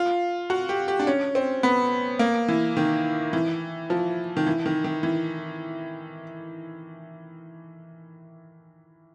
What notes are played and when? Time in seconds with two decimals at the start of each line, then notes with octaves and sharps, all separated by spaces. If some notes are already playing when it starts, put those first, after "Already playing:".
Already playing: F4
0.50 F#4
0.69 G4
0.88 G4
1.00 D4
1.07 C#4
1.35 C4
1.63 B3
2.19 A#3
2.48 E3
2.77 D#3
3.33 E3
3.90 F3
4.37 D#3
4.47 E3
4.66 D#3
4.84 D#3
5.03 E3